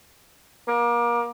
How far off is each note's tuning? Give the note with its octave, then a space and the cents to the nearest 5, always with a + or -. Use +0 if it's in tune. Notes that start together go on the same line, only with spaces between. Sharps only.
A#3 +30